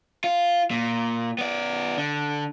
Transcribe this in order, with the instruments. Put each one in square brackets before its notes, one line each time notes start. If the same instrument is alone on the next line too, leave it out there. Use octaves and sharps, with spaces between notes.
[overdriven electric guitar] F4
A#2
B3 D5
D3